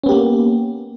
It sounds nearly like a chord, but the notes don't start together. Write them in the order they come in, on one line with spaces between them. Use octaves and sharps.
C#4 B3 G4 A#3